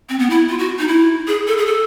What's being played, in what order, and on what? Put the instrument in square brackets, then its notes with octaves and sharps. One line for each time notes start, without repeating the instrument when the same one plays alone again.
[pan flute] C4
B3
E4
F4
F#4
D#4
E4
G#4
A4
G#4
A4